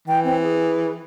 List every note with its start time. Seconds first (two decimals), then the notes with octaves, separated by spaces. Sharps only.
0.08 E3 G5
0.24 C4
0.42 G#4